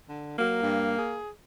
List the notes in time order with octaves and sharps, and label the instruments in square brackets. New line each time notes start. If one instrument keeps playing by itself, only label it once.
[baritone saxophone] D3
[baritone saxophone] F#3 [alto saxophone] A#3
[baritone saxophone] G2
G#4